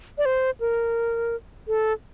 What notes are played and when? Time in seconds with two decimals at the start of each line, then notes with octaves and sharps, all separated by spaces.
0.18 D5
0.25 C5
0.60 A#4
1.68 A4